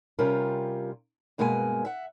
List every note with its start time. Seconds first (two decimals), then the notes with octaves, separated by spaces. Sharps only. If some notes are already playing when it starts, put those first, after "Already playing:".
0.19 C3 G3 C#4 F4 A#4
1.38 G2 B2 G#3 A#3 G#4 G#5
1.85 E5 F#5